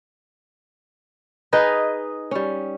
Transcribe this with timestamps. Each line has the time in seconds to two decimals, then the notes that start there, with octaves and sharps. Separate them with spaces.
1.53 D#4 G#4 B4 D#5
2.31 G3 C#4